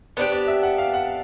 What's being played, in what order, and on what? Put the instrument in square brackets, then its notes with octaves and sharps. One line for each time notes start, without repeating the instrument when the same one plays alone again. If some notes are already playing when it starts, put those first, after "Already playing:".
[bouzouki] B3 D4 G4 [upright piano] C5
[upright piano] D5
E5
F#5
F5
F#5